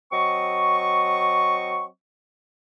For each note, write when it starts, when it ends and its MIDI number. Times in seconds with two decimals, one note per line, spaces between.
0.12 1.86 54
0.12 1.86 60
0.12 1.86 75
0.12 1.86 85